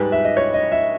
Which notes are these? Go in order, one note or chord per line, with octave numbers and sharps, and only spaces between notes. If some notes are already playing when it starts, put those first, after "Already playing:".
Already playing: G#2 G3 B4
E5
D#5
C#5
D#5
E5